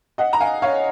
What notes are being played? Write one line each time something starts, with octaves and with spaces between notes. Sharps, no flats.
D#5 F#5
A#5
F5 G#5
C#5 F5